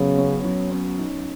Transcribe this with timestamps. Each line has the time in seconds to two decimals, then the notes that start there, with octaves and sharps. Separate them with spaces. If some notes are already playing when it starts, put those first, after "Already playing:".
Already playing: C#3 F#3 B3
0.18 C#4
0.45 F#3
0.71 C#4
0.99 D#4